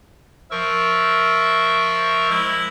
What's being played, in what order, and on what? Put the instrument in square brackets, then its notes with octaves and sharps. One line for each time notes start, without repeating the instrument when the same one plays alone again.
[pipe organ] F3 A#4 C#6 [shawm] E5
[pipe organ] G#3 [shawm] E4